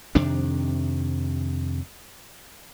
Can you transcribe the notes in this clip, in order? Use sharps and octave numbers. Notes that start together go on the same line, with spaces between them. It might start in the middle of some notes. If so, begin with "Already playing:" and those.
F2 C3 D#3 D4